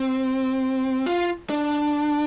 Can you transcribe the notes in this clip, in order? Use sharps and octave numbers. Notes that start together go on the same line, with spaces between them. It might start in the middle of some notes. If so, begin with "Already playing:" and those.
Already playing: C4
F4
D4